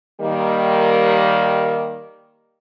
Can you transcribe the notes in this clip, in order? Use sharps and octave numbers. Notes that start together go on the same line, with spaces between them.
D#3 G3 A#3